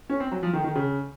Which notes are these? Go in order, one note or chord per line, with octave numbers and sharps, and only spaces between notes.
C#4
C4
F#3
F3
D#3
D#3
C#3